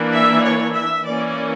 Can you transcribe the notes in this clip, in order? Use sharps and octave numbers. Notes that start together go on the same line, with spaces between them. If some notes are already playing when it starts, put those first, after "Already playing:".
Already playing: E3 A#3 D4
E5
C#5
E5
E3 A#3 C#4 D5